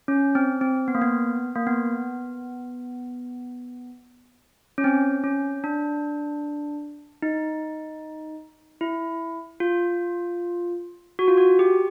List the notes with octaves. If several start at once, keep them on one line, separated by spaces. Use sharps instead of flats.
C#4
C4
C4
B3
A#3
B3
A#3
B3
C#4
C4
C#4
D4
D#4
E4
F4
F#4
F4
F#4
G4